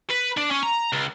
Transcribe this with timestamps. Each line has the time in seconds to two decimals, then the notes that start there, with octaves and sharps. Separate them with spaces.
0.10 B4
0.37 D4
0.51 C#4
0.63 A#5
0.93 C#2